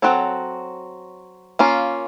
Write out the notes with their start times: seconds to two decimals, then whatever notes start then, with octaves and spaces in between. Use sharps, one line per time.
0.02 F#3 C4 F#4 A4 C#5
1.59 A#3 C#4 F4